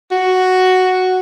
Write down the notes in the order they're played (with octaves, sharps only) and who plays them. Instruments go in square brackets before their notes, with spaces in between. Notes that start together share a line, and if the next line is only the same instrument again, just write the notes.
[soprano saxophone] F#4